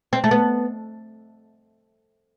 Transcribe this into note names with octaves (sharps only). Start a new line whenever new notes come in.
C4
A3
B3